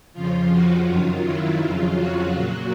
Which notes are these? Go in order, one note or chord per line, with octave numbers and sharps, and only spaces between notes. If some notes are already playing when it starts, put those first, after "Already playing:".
F2 C#3 F3 F4
F#4
F#2 D#3 F#3 F4
E4
F2 C#3 F#3 F4
F#4
A#2 F#3